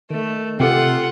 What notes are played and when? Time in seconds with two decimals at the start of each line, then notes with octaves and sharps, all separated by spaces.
0.10 D#3 A3
0.60 C3 C4 F4 G4 A4 F#5